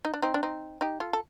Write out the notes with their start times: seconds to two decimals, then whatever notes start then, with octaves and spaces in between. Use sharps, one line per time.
0.05 D#4
0.14 D4
0.22 C4 D#4
0.34 D4
0.43 C4 D#4
0.81 D#4 G4
1.00 F4 A4
1.13 A4